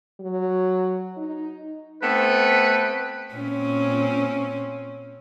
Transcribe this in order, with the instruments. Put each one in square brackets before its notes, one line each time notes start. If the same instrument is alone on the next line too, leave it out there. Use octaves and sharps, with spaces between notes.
[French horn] F#3
D#4
[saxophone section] A3 B3 C4 [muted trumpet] B4
[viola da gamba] A#2 C4 C#4